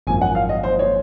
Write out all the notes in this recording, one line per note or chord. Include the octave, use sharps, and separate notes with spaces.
G#1 F#2 F3 A#3 G#5
F#5
F5
D#5
C5
C#5